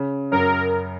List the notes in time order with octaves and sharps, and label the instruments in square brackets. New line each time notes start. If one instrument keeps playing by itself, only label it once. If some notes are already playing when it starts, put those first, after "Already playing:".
Already playing: [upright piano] C#3
[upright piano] F#2 [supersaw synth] A#4